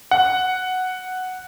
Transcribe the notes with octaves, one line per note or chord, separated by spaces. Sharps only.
F#5